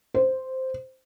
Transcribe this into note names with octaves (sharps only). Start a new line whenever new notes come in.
C5